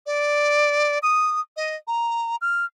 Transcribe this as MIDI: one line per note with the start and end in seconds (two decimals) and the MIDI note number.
0.06 0.99 74
1.02 1.40 87
1.56 1.76 75
1.87 2.36 82
2.41 2.65 89